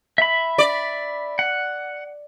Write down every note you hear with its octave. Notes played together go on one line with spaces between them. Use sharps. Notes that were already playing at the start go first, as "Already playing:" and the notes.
E5 B5
D5
F#5